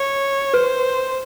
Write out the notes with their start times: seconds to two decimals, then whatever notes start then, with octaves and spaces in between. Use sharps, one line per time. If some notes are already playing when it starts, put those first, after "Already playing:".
Already playing: C#5
0.53 B4 C5